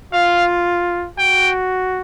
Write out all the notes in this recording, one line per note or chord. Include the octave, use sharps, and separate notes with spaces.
F4 F5
F#4 G5